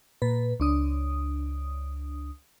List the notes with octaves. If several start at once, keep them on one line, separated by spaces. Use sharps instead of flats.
A#2 B4
C#2 D4 D#6